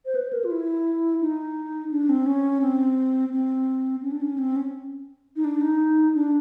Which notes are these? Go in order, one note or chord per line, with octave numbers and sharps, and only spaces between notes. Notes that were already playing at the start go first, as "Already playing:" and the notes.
C5
B4
A#4
F4
E4
D#4
D4
C4
C#4
C4
C4
C#4
D4
C#4
C4
C#4
D#4
D4
D#4
D4